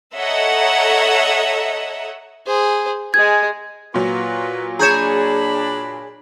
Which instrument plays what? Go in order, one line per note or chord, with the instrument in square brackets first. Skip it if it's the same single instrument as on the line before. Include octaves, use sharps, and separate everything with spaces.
[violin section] A4 C#5 D#5 E5 F#5 A#5
[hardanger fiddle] G#4 C5
[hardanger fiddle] G#3 G#4 [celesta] G#6
[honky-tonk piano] A#2 F#3 [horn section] F4 B4
[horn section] D4 B5 [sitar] G#4 C#5 [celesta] A#5 G6 E7